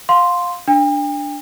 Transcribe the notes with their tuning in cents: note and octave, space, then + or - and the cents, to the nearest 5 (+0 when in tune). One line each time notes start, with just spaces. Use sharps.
F5 +20 C6 +0
D4 +0 G5 +45